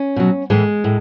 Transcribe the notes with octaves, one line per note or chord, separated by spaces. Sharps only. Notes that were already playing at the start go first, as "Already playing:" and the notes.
Already playing: C#4
B2 F#3
A2 E3 G#3
A2